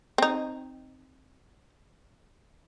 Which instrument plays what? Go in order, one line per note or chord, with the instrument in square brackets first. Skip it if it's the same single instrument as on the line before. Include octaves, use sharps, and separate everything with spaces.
[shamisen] C4 D#4